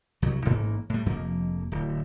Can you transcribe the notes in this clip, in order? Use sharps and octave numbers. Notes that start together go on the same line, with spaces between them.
C2 F#3
A1 G#2 A#3
A2 G3
F1 F2 F3 A#3
D1